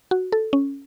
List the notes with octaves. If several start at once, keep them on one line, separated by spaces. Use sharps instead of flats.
F#4
A4
C#4